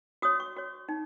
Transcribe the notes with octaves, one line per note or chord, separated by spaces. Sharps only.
F#4 C#5 D#6
C#6
F#4 C#5
D#4